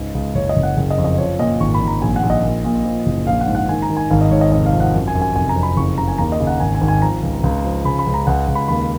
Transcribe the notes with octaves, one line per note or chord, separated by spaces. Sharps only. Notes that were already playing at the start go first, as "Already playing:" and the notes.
Already playing: C#2 G#2 D#5
C#2
F#1 C#5
D#5
F#1
F#5
F#1
D#5
F2
D#5
F3 C#5
A#2 D#5
G#1 C#6
B5
G#1
A#5
A#1 G#5
F#5
A#1
D#5
A#2
A#2
F3
F#1
A#1 F5
F#5
G#2
F#5
D#3 G#5
A#5
D#3
G#5
G#1 F5
D#5
G#2 C#5
D#5
F1 D#5
F5
F3
F#5
F#2
G#5
F#2
G#5
F1 G#5
A#5
F2
B5
F#1 C#6
C#3 A#5
G#5
D#2 A#5
D#5
C#3
F#5
G#1 G#5
G#5
G#1
G#5
F3 A#5
C#2
C#2
F3
C#3 B5
B5
C#2
A#5
C#2 F#5
C#2
B5
D#2 B5